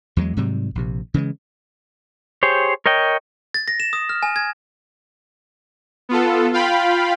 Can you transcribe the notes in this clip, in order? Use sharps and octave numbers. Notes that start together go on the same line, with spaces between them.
E2 G2 F#3 G#3
G#2 C3 F#3 G3
A#1 C3
C#3 E3 G3 G#3
G4 G#4 C5 C#5
A#4 C#5 D#5 G5
A6
A#6
E7
D#6
F6
G#5
G#6
B3 F4 A4
F4 F5 G5 B5